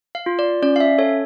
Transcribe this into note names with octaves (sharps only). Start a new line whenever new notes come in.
F5
F4
D5
C#4 D5
F5
E5
A4 C#5